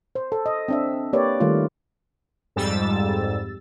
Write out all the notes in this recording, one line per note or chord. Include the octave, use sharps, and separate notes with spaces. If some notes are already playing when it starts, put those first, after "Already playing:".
C5
A4
D#5
C4 D4 E5
A#3 G4 B4 C#5 D5
D#3 G3 A3 F4
F2 G#2 G3 E6 A6